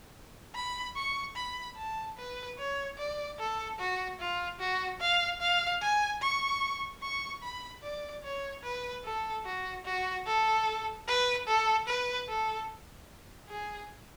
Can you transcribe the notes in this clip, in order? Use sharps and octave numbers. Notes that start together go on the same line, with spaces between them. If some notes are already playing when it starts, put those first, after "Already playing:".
B5
C#6
B5
A5
B4
C#5
D5
A4
F#4
F4
F#4
F5
F5
G#5
C#6
C#6
B5
D5
C#5
B4
A4
F#4
F#4
A4
B4
A4
B4
A4
G#4